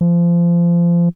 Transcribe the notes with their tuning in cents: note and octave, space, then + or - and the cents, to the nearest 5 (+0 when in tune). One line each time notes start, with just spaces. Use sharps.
F3 -25